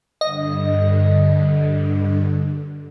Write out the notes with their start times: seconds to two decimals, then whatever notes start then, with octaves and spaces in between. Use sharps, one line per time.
0.21 G2 D3 D#5